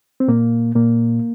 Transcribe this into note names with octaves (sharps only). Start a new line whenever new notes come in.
C4
A#2 A#3
A#2 A#3